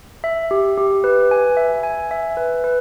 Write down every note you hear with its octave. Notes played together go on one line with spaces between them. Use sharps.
E5
G4
G4
B4
G#5
E5
G#5
E5
B4
B4